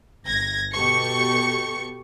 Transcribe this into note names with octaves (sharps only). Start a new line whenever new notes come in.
G1 G#6 A#6
B2 G4 A4 C#6 C#7